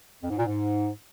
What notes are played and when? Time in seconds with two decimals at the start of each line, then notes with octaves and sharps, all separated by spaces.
0.22 F2
0.30 G#2
0.38 A#2
0.45 G#2